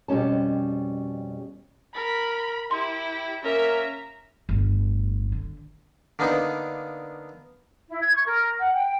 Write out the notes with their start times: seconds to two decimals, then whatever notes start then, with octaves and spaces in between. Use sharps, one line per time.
0.08 F2 B2 G3 C#4 A5
1.95 A#4 B5
2.71 E4 G4 C6
3.44 A#3 C#4 A#4 E5 A#5
4.49 G1 A2
5.32 D3
6.19 D3 A#3 B3 D4 D#4
7.89 E4
8.01 G#6
8.14 C#6
8.26 A#4
8.58 F#5
8.73 G5